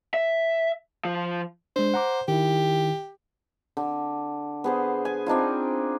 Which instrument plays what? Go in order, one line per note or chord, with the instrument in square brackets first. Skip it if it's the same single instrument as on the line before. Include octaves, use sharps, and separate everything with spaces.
[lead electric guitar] E5
F3
[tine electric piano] G#3 D4 [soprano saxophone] C5
[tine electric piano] F#5 A#5 D6
[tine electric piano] D#3 E4 [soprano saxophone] G4
[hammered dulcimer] D3
B3 G#4 C5
G#5
C4 D4 D#4 F4